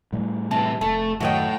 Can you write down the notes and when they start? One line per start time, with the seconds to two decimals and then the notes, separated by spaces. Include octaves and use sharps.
0.12 A2 G3 A3
0.51 C3 E3 A5
0.81 F1 A3 A5
1.21 F#2 A2 D#3 F#4 C#5 D#5 F#5 G5